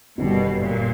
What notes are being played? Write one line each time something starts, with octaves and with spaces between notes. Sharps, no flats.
G1 F#2 B2 D#3 G3
A#2